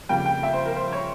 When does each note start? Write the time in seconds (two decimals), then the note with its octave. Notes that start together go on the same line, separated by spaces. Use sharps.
0.09 F2 C#3 G3 A#3 G5
0.26 G5
0.43 E5
0.53 C5
0.66 A#4
0.76 C5
0.93 C#5